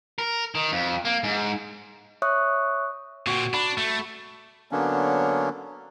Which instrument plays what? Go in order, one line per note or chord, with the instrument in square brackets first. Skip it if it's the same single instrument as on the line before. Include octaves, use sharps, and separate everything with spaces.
[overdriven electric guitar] A#4
D#3
F2
A#3
G#2
[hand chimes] C#5 E5 C#6 D#6 F#6
[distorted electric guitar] A#2 C4 [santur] F#4
[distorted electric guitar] D4 [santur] B5
[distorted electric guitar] A3
[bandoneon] D3 F#3 A#3 B3 C#4 D4